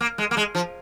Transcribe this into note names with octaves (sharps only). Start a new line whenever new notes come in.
A#3
G#3
A#3
G#3
F3